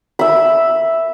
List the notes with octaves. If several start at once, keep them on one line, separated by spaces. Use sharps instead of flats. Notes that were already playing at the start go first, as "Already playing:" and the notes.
E5 B5